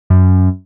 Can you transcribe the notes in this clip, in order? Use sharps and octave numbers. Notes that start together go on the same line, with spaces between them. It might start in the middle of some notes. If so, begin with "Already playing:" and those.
F#2